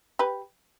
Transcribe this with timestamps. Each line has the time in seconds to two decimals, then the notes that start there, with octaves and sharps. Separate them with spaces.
0.19 G4 B4